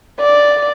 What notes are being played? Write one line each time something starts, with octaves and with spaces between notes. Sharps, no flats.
D5